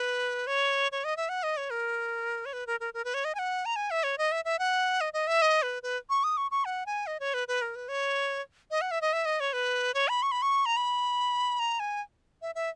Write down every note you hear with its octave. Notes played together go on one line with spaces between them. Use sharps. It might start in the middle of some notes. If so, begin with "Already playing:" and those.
Already playing: B4
C#5
C#5
D#5
E5
F#5
D#5
C#5
A#4
C#5
B4
A#4
A#4
A#4
B4
C#5
D#5
G#5
F#5
A#5
G#5
E5
C#5
D#5
E5
E5
F#5
D#5
D#5
E5
D#5
B4
B4
C#6
D#6
C#6
C#6
F#5
G#5
D#5
C#5
B4
B4
A#4
B4
C#5
D#5
F#5
E5
D#5
E5
D#5
C#5
B4
C#5
B5
C#6
B5
C#6
A#5
B5
A#5
G#5
E5
E5